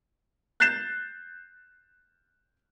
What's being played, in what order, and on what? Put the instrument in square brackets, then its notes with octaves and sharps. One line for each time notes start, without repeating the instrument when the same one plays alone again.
[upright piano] F#6 G6 A6 C7 E7